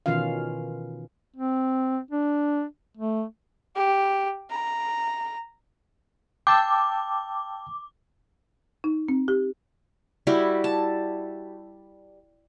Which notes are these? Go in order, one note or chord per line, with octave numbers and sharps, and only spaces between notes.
B2 D#3 E3 C#4 F4 F5
C4
D4
A3
G4
A#5
G5 A5 D6 E6
D#4
C4
G4
G3 E4 F#4 G4
A5